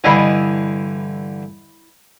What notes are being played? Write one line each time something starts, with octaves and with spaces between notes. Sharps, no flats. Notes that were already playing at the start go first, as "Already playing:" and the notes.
G2 D3 E3 E4 D#5